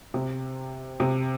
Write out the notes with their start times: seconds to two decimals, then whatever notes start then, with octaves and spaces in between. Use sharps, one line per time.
0.14 C3
1.00 C3